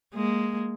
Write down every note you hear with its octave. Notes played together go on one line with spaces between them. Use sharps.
G#3 A#3